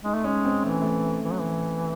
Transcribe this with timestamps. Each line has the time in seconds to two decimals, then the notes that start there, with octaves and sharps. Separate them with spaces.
0.04 G#3 D#4
0.15 A3
0.24 G#3 C#4
0.45 C4
0.64 E3 A3
0.82 A3
1.25 E3
1.33 F#3
1.41 E3